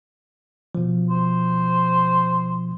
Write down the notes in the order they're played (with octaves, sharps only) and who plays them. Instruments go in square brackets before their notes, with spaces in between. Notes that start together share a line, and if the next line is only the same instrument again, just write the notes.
[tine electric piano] B2 F3
[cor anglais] C5